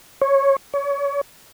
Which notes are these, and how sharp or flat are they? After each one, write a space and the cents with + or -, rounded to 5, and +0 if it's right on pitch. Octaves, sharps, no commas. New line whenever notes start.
C#5 -10
C#5 +30